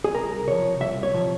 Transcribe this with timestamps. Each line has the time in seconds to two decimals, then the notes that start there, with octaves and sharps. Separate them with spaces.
0.04 G#4
0.14 C2 A#4
0.47 C3 F3 C#5
0.80 C2 E5
1.03 C#5
1.14 C3 F3